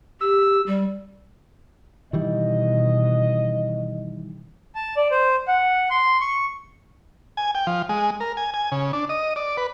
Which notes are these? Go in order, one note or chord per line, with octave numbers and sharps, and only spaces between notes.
G4 E6
G3
B2 D#3 E3 G3 D#5
A5
D5
C5
F#5
C6
C#6
G#5
G5
F3
G#3
A#4
G#5
G#5
C#3
D4
D#5
D5
B4